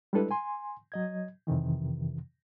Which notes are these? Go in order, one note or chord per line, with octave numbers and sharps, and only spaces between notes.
G3 G#3 D4 E4 A4 B4
G#5 C6
F#3 D#5 G#6
F2 C3 D#3 E3